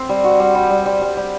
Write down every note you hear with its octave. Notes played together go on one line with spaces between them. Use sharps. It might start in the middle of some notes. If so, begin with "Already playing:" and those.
Already playing: C4
G3
F#4
G3
G3
G3
G3
G3
G3